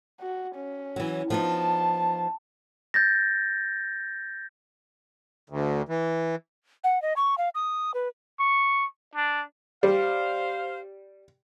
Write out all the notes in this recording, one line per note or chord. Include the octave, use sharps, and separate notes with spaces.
F#4
C#4
E3 F#3
F3 B3 D#4 A5
G6 A6 A#6
D2
E3
F#5
D#5
C#6
F5
D#6
B4
C#6
D4
G3 C5 F5